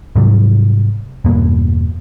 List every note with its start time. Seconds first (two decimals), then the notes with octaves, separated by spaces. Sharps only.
0.16 G#2 C3 F#3 G3
1.25 E2 G2 B2 A#3